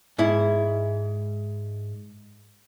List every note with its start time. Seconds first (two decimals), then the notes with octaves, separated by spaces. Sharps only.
0.18 G#2 E4